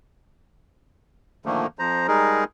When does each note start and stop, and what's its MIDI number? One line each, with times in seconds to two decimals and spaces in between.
1.46 1.67 46
1.46 1.67 50
1.46 1.67 51
1.46 1.67 53
1.46 1.67 57
1.46 1.67 58
1.79 2.07 41
1.79 2.07 53
1.79 2.07 72
1.79 2.07 82
2.08 2.44 55
2.08 2.44 56
2.08 2.44 63
2.08 2.44 68
2.08 2.44 70